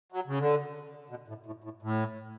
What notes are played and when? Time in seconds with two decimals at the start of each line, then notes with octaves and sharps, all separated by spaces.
0.12 F#3
0.27 C#3
0.39 D3
1.10 B2
1.28 A2
1.46 A2
1.64 A2
1.82 A2